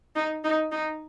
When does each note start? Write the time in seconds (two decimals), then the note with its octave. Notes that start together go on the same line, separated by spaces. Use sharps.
0.16 D#4
0.44 D#4
0.72 D#4